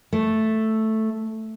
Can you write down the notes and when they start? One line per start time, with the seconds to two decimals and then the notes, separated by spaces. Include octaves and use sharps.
0.13 A3